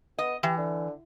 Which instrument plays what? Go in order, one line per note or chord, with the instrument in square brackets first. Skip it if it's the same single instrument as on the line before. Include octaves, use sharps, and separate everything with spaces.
[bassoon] B3 [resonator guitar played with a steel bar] D#5
[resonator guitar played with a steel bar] E3 [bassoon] G4
[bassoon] D3